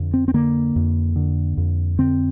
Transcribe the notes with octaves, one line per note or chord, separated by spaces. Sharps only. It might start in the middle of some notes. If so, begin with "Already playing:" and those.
Already playing: F2 D3
C4
C4
D3 A#3
F2
D3
F2
D3 C4